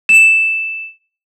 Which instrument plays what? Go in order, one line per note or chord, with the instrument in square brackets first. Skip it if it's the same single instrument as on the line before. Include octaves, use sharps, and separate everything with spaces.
[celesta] E7